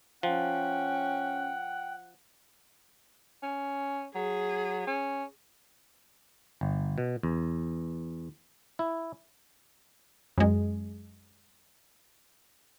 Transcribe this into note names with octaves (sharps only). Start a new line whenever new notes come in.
F3 C#4 F#5 G5
C#4
F#3 G#4
C#4
G1
B2
E2
E4
F#2 G#3